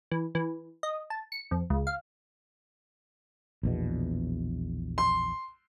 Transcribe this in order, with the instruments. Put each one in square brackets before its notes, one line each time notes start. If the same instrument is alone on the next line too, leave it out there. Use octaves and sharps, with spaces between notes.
[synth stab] E3
E3
D#5
A5
C#7
F2
C#2
F5
[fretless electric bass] A#1 E2 B2
[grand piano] C6